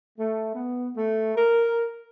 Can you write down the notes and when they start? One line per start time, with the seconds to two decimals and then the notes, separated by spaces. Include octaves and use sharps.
0.19 A3
0.55 B3
0.96 A3
1.36 A#4